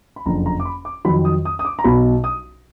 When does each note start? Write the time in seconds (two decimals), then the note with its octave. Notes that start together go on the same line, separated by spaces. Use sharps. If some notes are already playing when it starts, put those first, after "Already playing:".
0.16 B5
0.26 F#1 F2 D3 A#5
0.46 A#5
0.60 D6
0.65 B5
0.85 D6
1.05 F2 D#3 F#3 B5
1.25 D#6
1.45 D#6
1.59 D#6
1.65 D6
1.79 A#5
1.84 B1 B2 F#3 B5
2.24 D#6